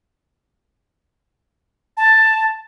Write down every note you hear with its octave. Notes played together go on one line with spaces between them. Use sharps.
A5